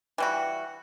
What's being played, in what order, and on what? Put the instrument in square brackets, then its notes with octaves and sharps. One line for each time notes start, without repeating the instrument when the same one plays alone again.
[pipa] E3 G3 F#4